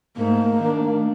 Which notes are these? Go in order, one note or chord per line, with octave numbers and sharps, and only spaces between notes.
G#2 A3 A#3
D#3 A3 D4